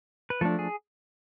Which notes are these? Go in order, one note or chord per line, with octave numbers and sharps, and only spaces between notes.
B4
F3 A3 D4 A4
G#4